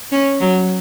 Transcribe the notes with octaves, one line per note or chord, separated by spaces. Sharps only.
C#4
F#3